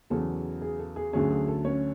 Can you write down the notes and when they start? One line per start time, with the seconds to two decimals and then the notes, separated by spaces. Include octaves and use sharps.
0.10 E2 C#3 F#3 A4
0.61 G#4
0.79 A4
0.96 G#4
1.13 D2 D3 F#3 C#4 G#4
1.30 G#4
1.48 A4
1.65 C#4 C#5